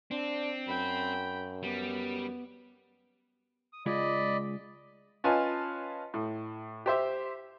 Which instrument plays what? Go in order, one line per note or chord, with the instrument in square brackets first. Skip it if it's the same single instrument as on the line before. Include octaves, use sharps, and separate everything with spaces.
[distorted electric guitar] C4 [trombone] D4
[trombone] F#2 [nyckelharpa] G5 B5
[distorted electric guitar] G3 [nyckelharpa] B3
[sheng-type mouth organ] D#6
[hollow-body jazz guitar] C#2 G#3 F4 [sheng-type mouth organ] D5 D#5 B5
[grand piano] C#4 F4 B4 D#5 G#5 A5
A2
G4 C5 E5